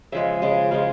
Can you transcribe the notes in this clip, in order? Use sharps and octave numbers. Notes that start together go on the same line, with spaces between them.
C#3 F3 G#3 E5
C#3 F3 G#3
C#3 F3 G#3 F5